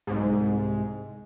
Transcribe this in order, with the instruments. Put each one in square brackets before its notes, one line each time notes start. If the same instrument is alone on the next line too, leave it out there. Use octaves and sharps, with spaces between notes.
[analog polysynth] C2 G#2